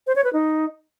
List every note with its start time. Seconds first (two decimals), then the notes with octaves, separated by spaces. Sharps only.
0.07 C5
0.16 C#5
0.24 B4
0.33 D#4